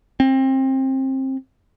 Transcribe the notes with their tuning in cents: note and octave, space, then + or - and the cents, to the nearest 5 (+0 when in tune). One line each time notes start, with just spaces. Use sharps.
C4 +25